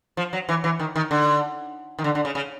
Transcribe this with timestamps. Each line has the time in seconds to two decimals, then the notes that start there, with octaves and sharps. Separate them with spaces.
0.17 F3
0.33 F#3
0.49 E3
0.64 E3
0.80 D#3
0.96 D#3
1.11 D3
1.98 D#3
2.04 D3
2.15 D3
2.25 C#3
2.35 C#3